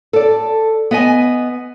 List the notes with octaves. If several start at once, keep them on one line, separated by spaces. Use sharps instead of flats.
A4 D5
B3 D#5 G#5